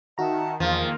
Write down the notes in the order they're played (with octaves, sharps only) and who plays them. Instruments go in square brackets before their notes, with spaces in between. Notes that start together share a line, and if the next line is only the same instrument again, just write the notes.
[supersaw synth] D#3 [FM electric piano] D#4 F#4 A#5 [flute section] E5 F#5 A5
[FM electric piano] E2 [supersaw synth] D#3 A#3 [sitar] F3 [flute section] G#4